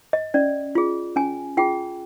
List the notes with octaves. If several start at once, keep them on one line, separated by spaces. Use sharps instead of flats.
D#5
C#4 D5
F4 G#4
C#4 G#5
F4 G#4 G5